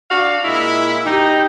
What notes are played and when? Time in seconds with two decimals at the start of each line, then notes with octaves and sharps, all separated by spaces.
0.11 D4 F#4 F5
0.44 A#2 G#3 E4
1.06 D#4 G4